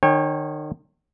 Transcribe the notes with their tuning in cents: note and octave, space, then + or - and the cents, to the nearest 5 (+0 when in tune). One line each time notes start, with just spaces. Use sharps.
D#3 -40 C#5 -20 G5 +30